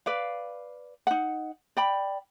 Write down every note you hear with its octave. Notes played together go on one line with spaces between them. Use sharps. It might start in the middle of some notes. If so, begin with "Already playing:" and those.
B4 D5 F5
D#4 F#5
D5 G5 B5